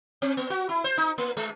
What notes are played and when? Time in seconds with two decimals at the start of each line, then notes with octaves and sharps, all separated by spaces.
0.22 C4
0.37 B3
0.50 F#4
0.69 E4
0.84 C5
0.98 D#4
1.18 A#3
1.37 G#3